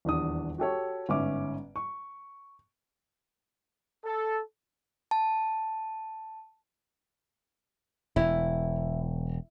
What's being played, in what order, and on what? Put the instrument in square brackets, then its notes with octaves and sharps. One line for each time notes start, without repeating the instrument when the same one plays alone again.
[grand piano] D#1 E2 D4 D#6
F#4 G4 A4 C#5
G1 G#2 C#4 E5 D6
C#6
[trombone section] A4
[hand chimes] A5
[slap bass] E1 [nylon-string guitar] E4